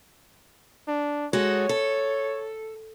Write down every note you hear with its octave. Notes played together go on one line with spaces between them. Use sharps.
D4
G#3 F#4 A4 C#5
A4